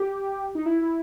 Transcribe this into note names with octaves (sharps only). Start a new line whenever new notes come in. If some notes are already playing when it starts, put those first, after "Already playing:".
Already playing: G4
D#4
E4
E4